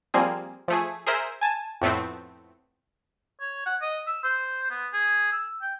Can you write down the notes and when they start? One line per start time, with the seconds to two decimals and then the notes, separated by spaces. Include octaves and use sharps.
0.14 F3 G3 A#3 C4 G#4
0.68 F3 A3 G#4
1.06 G#4 A#4 C5 E5
1.41 G#5 A5
1.81 F2 A2 A3 B3 C4
3.41 C#5
3.66 F#5
3.82 D#5
4.07 E6
4.24 C5
4.70 B3
4.93 G#4
5.32 E6
5.62 G5